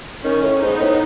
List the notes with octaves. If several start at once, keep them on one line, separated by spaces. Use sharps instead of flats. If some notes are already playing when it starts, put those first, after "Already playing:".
D#3 C#4
A2
G#2 B3 D#4
A2